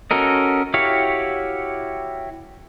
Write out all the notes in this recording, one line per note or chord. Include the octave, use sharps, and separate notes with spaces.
C#4 F#4 A4 A#4 D#5
E4 F#4 G4 C#5 F5